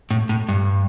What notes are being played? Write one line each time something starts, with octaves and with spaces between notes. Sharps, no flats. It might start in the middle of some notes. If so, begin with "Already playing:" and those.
A2
A2
G2